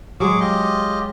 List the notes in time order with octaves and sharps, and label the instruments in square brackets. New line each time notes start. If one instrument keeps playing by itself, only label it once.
[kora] F#3 G#3 [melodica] G#4 C#6 D6
[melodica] F4 G4 D#5